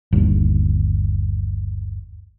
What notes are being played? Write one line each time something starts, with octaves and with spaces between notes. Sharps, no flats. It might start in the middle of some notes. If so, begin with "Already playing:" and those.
G1 D#2